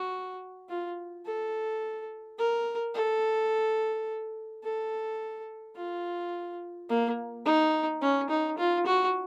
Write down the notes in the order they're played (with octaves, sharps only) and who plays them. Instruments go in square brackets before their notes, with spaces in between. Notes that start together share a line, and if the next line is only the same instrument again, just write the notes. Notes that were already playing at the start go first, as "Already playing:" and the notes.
Already playing: [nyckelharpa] F#4
F4
A4
A#4
A4
A4
F4
A#3
D#4
C#4
D#4
F4
F#4